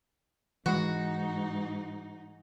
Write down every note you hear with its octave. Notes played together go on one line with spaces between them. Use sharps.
G#2 E3 G#3 D#4 F#4